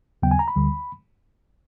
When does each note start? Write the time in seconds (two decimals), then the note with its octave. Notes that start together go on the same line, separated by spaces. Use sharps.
0.22 D#2 C#3 F#3 B3 G5
0.31 G#5
0.39 A#5
0.48 B5
0.56 D2 D3 G3